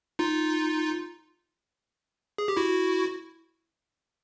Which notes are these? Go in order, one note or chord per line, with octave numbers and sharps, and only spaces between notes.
D#4 F4
G#4
G4
E4 F#4